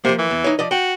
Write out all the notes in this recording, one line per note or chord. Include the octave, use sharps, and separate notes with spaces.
C3 F3 A#3
E3
E2
D#4 C#5
F3 D5 D#5
F#4 G5